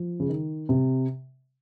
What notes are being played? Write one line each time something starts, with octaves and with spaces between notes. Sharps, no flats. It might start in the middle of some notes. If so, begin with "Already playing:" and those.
Already playing: F3
C#3
D#3
C3